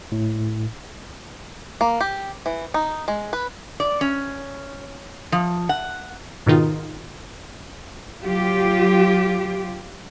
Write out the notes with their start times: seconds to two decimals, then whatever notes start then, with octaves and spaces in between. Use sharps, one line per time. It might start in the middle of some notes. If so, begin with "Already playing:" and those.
0.12 A2
1.81 A#3
2.01 G4
2.46 E3
2.74 D#4
3.08 G#3
3.33 B4
3.80 D5
4.01 C#4
5.32 F3
5.69 F#5
6.46 G#2 B2 D#3 D#4 F4
8.22 F#3 F4 G4